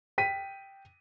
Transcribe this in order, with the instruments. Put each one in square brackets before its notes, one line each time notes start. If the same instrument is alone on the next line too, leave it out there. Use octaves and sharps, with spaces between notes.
[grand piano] G5 B6 D#7